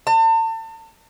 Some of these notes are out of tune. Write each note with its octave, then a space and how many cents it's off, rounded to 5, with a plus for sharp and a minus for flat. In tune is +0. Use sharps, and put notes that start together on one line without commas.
A5 +40